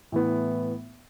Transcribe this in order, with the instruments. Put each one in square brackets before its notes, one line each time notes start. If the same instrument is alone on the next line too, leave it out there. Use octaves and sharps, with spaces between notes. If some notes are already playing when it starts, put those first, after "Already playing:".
[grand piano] A2 E3 B3